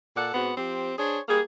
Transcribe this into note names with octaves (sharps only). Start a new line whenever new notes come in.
A#2 A4 D5 F#5
G#2 B3 C4 F#4
F3 C4 G4
D4 G#4 C5 C#5
G3 A#3 G#4